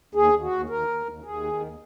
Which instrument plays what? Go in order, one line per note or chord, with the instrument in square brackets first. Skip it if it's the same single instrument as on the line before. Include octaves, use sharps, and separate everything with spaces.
[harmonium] D#2 G#4
D#2
F#4
D#2
D#2 A#4
D#2
D#2
D#2 G#4
D#3
D#2